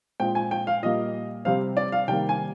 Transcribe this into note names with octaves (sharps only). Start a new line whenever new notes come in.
A#2 G#3 C4 G5
G#5
G5
F5
A#2 G3 A#3 D#5
C3 G3 C4 F5
D5
F5
C3 D#3 G3 A#3 G5
G#5